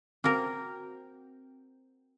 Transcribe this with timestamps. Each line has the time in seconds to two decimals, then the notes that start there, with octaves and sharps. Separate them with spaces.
0.24 A#3 C4 F#4 A#4 G5